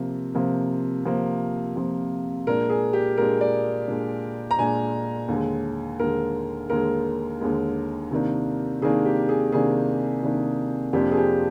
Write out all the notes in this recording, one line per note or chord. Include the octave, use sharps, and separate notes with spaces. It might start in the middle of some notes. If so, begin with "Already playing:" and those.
Already playing: C3 F3 A#3
C3 F3 A#3
C3 F3 A#3
C3 F3 A#3
A#2 G#3 D4 A#4
G#4
G4
A#2 G#3 D4 A#4
D5
A#2 G#3 D4
A#5
A#2 G#3 D4 G#5
D#2 D3 G#3
D#2 D3 G#3 A#4
D#2 D3 G#3 A#4
D#2 D3 G#3
C3 D#3 A#3 D4
C3 D#3 A#3 D4 G#4
G4
G#4
C3 D#3 A#3 D4 G#4
C3 D#3 A#3 D4
F2 C3 F3 A#3 D4 G4
G#4
G4